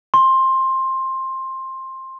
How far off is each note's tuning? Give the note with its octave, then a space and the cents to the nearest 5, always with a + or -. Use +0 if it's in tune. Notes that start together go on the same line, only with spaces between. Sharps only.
C6 +15